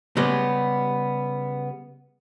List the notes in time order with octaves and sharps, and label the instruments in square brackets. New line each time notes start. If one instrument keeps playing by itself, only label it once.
[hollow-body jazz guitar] C#3 G3 G#3 B3